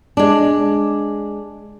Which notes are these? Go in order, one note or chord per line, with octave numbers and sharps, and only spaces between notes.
G#3 D4